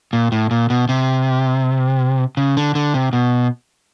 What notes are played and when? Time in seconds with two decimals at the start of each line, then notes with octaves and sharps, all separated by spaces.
0.13 A#2
0.32 A2
0.51 A#2
0.70 B2
0.89 C3
2.37 C#3
2.57 D3
2.75 D3
2.94 C3
3.13 B2